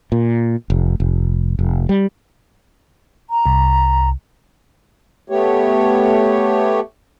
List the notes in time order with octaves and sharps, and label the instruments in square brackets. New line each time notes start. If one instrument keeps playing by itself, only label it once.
[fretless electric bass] A#2
F1
F1
F1
G3
[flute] A#5
[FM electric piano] C2
[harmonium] A3 B3 G4 C#5